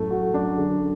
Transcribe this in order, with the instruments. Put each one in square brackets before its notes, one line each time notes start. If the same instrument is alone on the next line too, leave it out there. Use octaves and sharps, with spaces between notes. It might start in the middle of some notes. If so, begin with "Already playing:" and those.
Already playing: [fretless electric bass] F#2 A2 [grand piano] A3
[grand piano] F#4
[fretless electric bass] F#2 [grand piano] D4
[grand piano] D3